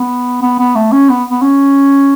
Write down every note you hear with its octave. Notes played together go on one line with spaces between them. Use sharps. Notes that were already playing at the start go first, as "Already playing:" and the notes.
Already playing: B3
B3
B3
A3
C#4
B3
B3
C#4